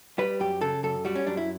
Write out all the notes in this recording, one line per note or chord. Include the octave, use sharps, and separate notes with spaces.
G3 B4
F#2 G4
C#3 A4
F#2 A4
G3 F#4
C#4
F#2 D4
E4